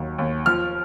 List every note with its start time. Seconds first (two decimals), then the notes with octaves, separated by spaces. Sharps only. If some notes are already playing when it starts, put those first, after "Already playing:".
Already playing: D#2 F#3
0.18 D#2
0.46 F3 F6